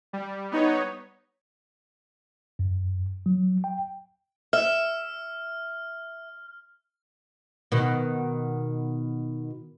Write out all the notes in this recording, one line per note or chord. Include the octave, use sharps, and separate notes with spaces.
G3
B3 D#4 C#5
F#2
F#3
G5
E5 F6
B2 D#3